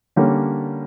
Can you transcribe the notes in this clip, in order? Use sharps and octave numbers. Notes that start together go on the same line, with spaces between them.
D3 G3 A#3 C#4